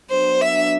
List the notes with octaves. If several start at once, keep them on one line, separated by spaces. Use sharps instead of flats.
F#3 B3 D4 C5
E5